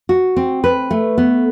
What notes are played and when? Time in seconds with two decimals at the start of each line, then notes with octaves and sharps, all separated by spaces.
0.09 F#4
0.36 C4
0.64 B4
0.91 A3
1.18 B3